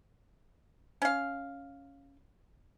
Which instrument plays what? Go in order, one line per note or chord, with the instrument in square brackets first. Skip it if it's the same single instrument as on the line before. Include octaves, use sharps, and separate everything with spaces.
[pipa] C#4 F5